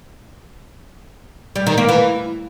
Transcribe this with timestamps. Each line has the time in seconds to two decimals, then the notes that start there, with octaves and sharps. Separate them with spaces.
1.56 G3
1.67 D#3
1.78 A#3
1.89 E3